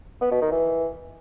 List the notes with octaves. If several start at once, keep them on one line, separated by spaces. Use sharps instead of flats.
B3
B2
D#3
E3